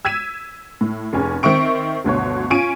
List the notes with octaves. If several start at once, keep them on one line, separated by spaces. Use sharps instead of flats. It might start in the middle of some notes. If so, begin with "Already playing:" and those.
E6 G#6 B6 D#7 E7
A2
F1 C#4 G#4
D#3 C4 E5 C#6 D7
G1 D2 B2 C#5
C#4 F4 C#6 D7 D#7